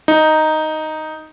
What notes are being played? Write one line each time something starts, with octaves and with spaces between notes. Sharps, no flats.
D#4